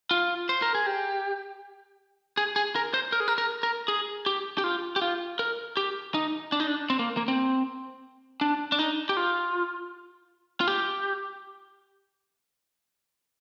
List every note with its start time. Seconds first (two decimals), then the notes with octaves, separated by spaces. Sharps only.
0.11 F4
0.49 C5
0.62 A#4
0.75 G#4
0.86 G4
2.37 G#4
2.56 G#4
2.76 A#4
2.94 C5
3.12 A#4
3.20 G#4
3.28 A#4
3.38 A#4
3.63 A#4
3.88 G#4
4.26 G4
4.58 G4
4.64 F4
4.96 G4
5.02 F4
5.39 A#4
5.77 G4
6.14 D#4
6.52 D4
6.60 D#4
6.67 D4
6.90 C4
6.99 A#3
7.17 A#3
7.28 C4
8.41 D4
8.72 D4
8.79 D#4
9.09 G4
9.17 F4
10.61 F4
10.68 G4